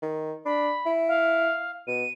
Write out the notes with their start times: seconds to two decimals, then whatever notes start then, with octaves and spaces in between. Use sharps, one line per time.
0.02 D#3
0.45 D4 B5
0.86 E4
1.08 F5
1.87 B2 D#7